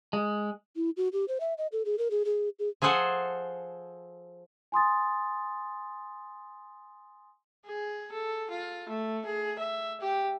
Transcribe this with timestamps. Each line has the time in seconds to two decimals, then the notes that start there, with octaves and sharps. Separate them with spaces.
0.13 G#3
0.76 E4
0.97 F#4
1.13 G4
1.28 C5
1.40 E5
1.58 D#5
1.72 A4
1.85 G#4
1.98 A#4
2.11 G#4
2.25 G#4
2.59 G#4
2.82 F3 G#4 A4 C5 F#5 G#5
4.72 G#5 C6 D#6 A6
7.66 G#4
8.12 A4
8.50 F4
8.89 A3
9.26 G#4
9.59 E5
10.00 G4